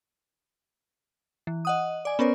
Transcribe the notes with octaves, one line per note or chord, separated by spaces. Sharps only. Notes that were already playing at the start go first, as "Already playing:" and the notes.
E3
D#5 F#5 D#6
D5 G#5
B3 C#4 A#4 C5 D5